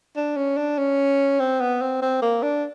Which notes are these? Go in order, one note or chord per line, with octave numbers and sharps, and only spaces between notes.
D4
C#4
D4
C#4
C4
B3
C4
C4
A#3
D4